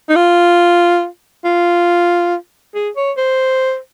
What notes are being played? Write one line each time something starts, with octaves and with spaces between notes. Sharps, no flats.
D#4
F4
F4
G#4
C#5
C5